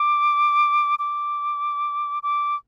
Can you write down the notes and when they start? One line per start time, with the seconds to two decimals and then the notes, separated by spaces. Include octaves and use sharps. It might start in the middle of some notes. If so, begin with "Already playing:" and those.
Already playing: D6
0.99 D6
2.23 D6